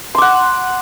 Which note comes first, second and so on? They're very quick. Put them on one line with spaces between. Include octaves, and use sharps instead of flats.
C6 D6 F#5